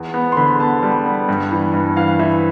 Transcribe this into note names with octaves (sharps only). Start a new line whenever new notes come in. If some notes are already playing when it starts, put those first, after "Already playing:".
Already playing: E2
B3
C6
D3 B5
B3 A5
G3
B3
G2
E3
G2
E3 F5
E3 E5